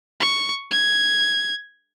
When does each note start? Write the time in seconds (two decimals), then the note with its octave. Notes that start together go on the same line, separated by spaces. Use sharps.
0.20 C#6
0.71 G#6